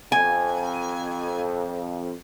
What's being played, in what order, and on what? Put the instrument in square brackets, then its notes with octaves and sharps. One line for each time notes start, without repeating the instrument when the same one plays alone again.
[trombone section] F2 [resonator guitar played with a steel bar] G#5